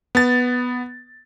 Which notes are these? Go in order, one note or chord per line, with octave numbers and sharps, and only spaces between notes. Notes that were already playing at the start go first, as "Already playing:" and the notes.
B3 A6